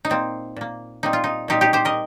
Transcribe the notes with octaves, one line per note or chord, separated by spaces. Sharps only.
D#4
A#2 A#3 C4
A#2 A#3
A#2 G3 C4 D#4
F4
D#4
A#2 G3 C4 D#4 G4
D#4 G4
G4 C5
A#4 D#5